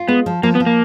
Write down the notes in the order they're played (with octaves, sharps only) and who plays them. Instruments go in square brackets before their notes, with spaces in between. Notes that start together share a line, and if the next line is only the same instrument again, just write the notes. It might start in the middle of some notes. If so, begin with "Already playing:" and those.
Already playing: [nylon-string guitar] F4
[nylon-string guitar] G#3 [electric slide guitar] B3
[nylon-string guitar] F3
[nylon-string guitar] F3 [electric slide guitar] A#3
[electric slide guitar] B3
[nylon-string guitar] F3
[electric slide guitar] A#3